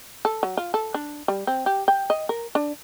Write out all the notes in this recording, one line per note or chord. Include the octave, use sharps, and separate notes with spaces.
A4
F#3
F4
A4
D4
G3
C4
G4
G5
D#5
A#4
D4